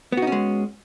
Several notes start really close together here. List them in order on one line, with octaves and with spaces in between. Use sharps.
B3 F#4 D#4 C#4 G#3